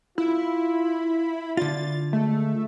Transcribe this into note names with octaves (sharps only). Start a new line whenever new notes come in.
E4 F4
D3 D4 F4 A6
G#3 A3